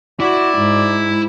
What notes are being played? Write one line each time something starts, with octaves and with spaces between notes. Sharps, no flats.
E4 F#4 D5
G#2